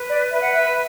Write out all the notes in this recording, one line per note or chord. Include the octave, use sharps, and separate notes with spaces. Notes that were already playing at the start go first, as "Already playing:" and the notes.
Already playing: B4
D5
B4 E5
F#5
E5